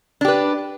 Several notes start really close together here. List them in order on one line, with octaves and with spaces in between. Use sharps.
D4 G4 B4